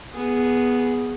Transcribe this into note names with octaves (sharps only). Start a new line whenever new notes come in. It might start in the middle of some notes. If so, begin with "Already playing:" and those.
B3 G#4